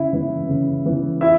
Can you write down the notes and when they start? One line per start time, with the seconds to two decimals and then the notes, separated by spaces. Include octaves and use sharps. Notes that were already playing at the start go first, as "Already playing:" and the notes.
Already playing: C#3 E4
0.13 E3 B3 E4
0.49 C#3
0.86 E3 B3 E4
1.21 E4 E5